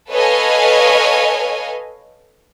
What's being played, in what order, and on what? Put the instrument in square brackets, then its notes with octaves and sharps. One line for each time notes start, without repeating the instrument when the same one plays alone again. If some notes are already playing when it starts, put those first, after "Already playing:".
[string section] A4 B4 C#5 D#5 F5 G#5